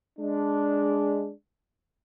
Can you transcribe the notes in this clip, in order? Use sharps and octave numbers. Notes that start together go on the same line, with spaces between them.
G#3 D4